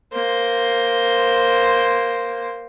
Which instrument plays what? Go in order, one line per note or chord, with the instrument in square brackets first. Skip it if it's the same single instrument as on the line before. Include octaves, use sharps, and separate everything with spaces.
[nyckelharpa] A#3 C5